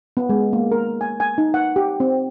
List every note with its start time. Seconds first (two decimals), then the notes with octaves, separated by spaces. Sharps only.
0.17 B3
0.29 G#3
0.53 A#3
0.72 A#4
1.01 G#5
1.20 G#5
1.38 D#4
1.54 F#5
1.76 G4
2.00 C4